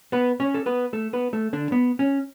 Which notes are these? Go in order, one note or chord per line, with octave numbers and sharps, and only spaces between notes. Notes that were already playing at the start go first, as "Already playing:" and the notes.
B3 B4
C#4 C#5
A4
B3 B4
A3 A4
B3 B4
A3 A4
D3 D4
B3
C#4